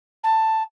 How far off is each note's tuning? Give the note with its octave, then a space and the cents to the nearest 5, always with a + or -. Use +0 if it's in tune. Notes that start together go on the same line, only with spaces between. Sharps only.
A5 +10